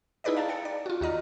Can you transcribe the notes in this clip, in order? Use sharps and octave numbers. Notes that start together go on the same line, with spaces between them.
D#4 E4 G#4 B4 D5 D#5
F5 A5 A#5 A6
G5 A6 C#7
D5
F4 F#4
D#2 F#4 D#5 A#5 F6